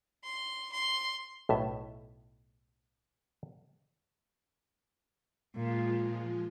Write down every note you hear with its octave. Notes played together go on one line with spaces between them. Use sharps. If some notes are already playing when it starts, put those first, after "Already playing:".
C6
C6
B1 A2 E5
A#2 F3 G#3 F4